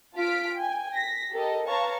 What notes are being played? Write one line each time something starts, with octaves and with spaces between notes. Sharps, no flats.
F4 A5 F6 B6 D7
G5 G#5
A#6 B6
G4 A4 A#4 D#5
B4 C#5 F5 A5 A#5 C#6